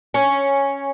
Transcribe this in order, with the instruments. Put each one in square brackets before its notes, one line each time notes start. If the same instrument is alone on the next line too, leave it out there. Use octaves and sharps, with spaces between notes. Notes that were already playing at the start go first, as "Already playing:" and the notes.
[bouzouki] C#4